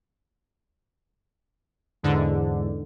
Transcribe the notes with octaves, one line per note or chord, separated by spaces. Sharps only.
E2 G#2 D3